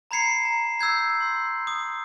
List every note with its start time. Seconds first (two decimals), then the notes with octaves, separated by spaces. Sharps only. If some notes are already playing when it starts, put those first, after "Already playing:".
0.11 A#5 B5 G#6 C7 C#7
0.45 A#5
0.79 E6 G6 G#6 C7
1.20 C6 C7
1.67 D#6